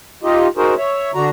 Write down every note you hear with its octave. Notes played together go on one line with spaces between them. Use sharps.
D#4 F4 G4 D#5
D#4 F#4 G#4 A#4 C5
C#5 E5
D3 D4 F#4 A#5